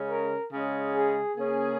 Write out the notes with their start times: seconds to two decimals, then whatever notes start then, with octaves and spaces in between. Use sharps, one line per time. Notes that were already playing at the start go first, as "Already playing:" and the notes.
Already playing: C#3 G#3 C#4
0.09 A#4
0.53 C#3 G#3 C#4
0.94 G#4
1.36 C#3 A#3 C#4 G#4